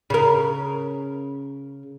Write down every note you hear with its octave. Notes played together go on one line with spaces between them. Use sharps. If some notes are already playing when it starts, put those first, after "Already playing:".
C#3 A#4